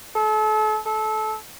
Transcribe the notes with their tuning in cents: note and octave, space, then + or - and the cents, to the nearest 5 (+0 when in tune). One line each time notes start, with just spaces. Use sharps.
A4 -35
A4 -25